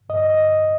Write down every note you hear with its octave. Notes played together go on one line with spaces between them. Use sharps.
G2 D#5
D#5